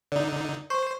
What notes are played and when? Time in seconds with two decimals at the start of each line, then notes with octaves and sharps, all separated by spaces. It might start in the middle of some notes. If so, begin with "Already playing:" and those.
0.12 D3 D#4 D5
0.70 C5 C#6